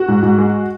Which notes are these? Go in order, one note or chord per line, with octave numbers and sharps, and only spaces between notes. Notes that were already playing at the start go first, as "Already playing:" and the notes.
Already playing: F#4
G#2
G#2
G#3